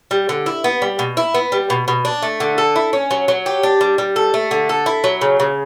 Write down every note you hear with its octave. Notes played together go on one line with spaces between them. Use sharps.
G3
D3
E4
B3
G3
B2
E4
B3
G3
B2
B2
D4
A3
D3
A4
E4
C#4
F#3
F#3
G4
D4
G3
G3
A4
A3
D3
A4
E4
F#3
C#3
C#3